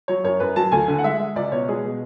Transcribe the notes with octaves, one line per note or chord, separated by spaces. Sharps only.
F#3 C#5
F#2 C#5
F#2 B4
F#3 A5
D2 G#5
D3
F#5
G#3 E5
G#3
C#2 D5
B2 C#5
G#3 G#4
B2